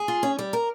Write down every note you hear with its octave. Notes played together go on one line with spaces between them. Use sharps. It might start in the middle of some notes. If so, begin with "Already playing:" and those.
Already playing: G#4
F4
C#4
G3
A#4